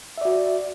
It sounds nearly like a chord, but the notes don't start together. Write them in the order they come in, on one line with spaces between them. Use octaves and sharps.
E5 D5 F#4